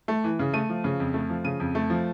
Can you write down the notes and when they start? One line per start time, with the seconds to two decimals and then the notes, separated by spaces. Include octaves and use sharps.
0.08 A3
0.24 E3
0.39 C#3
0.53 A3 D#7
0.69 F3
0.84 C#3
1.00 F2
1.14 A3
1.30 F3
1.44 C#3 D#7
1.60 F2
1.75 A3
1.90 F3